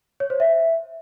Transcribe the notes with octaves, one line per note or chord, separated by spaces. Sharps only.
C#5
C5
E5